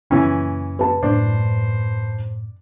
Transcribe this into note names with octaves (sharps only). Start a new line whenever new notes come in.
F#2 A#2 C#3 E3 C#4
B4 A5
F#2 A2 C3 D4 C5